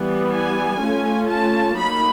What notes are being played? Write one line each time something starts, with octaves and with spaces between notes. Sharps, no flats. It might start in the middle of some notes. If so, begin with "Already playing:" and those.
Already playing: E3 G3 B3
G#5
A3 C#4 F4
A5
F#3 A#3 D#4 B5